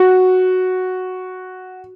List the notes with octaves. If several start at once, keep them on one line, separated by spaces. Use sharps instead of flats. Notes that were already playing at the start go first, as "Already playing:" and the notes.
Already playing: F#4